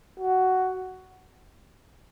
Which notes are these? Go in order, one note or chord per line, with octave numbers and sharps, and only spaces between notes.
F#4